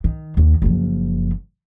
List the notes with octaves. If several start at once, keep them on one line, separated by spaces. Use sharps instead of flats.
D#3
D#2
F#1 F3